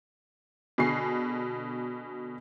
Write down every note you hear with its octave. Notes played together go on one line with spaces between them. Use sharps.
B2 D3 G#4 C#6 C7